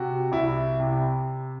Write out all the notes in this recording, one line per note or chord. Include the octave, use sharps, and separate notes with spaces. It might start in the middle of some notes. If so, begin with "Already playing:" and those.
Already playing: C3 F#4
C2 E4
C3